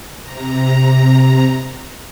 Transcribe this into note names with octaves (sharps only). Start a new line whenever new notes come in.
C3 A#5